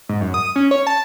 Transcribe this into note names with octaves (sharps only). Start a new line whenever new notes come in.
G#2
F#2
D#6
C#4
C#5
A5